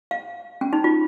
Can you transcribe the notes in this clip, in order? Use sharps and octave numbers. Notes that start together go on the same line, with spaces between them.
F5
C#4
D#4
F4